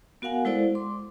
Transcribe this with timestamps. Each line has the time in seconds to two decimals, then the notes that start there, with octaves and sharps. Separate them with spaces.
0.22 B3 F#4 A#4 F5 F#5 G#5
0.45 G#3 E4 A4 C5 D5
0.75 C6 D6